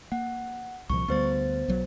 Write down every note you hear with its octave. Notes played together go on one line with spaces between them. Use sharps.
A#3 F#5
C2 A#2 F3 C#6
D2 G3 B3 C5 A6
B1 F#3